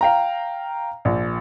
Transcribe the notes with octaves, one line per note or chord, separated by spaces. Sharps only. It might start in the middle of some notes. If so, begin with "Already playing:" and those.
F5 G5 A#5
A#1